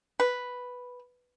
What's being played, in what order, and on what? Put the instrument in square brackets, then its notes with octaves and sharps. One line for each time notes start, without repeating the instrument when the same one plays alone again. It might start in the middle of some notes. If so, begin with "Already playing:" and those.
[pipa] B4